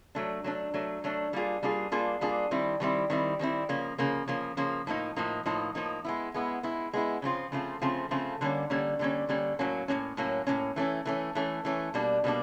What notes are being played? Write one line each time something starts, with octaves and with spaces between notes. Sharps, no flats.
F#3 A3 D4
F#3 A3 D4
F#3 A3 D4
F#3 A3 D4
G3 A#3 D4 F4 G#4
G3 A#3 D4 F4 G#4
G3 A#3 D4 F4 G#4
G3 A#3 D4 F4 G#4
D#3 G3 C4 E4
D#3 G3 C4 E4
D#3 G3 C4 E4
D#3 G3 C4 E4
C#3 F3 A#3
C#3 F3 A#3
C#3 F3 A#3
C#3 F3 A#3
A2 F3 A#3 D#4
A2 F3 A#3 D#4
A2 F3 A#3 D#4
A2 F3 A#3 D#4
G#3 B3 E4
G#3 B3 E4
G#3 B3 E4
G#3 B3 E4
C#3 F3 A3 C4 F4
C#3 F3 A3 C4 F4
C#3 F3 A3 C4 F4
C#3 F3 A3 C4 F4
D3 G3 A#3 C#4
D3 G3 A#3 C#4
D3 G3 A#3 C#4
D3 G3 A#3 C#4
A2 F#3 A#3 C#4
A2 F#3 A#3 C#4
A2 F#3 A#3 C#4
A2 F#3 A#3 C#4
E3 A3 C#4
E3 A3 C#4
E3 A3 C#4
E3 A3 C#4
B2 G3 A#3 D4
B2 G3 A#3 D4